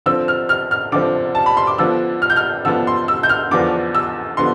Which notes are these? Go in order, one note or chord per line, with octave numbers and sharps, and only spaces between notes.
D3 F3 C4 E6
F6
F6
F6
D3 F3 C4 D6
A5
B5
C6
D6
D3 F3 B3 D4 E6
F6
G6
F6
D3 F3 B3 D4 E6
C6
E6
G6
F6
E2 D3 F3 B3 D4 D6
E6
D3 F3 B3 C6